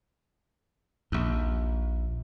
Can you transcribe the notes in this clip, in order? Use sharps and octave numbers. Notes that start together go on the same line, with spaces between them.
A#1 D#2